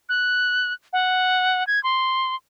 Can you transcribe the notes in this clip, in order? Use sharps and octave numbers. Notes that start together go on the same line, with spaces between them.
F#6
F#5
G#6
C6